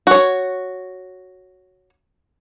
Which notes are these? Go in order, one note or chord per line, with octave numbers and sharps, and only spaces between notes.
F#4 C#5